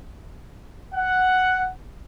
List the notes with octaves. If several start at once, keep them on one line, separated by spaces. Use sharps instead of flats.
F#5